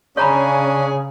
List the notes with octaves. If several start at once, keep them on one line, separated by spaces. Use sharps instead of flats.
C#3 C#4 D4 G#4 C#5 A#5 B5